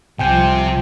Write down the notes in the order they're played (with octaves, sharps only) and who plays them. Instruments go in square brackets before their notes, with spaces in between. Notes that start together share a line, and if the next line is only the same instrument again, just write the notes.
[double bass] C2 F3 [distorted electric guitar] C3 [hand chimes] G5 G#5 G6